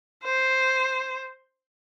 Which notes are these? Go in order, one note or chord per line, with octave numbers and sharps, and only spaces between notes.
C5